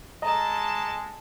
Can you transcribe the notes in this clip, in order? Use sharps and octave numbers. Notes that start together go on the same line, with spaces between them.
G#3 A4 D#5 A5 A#5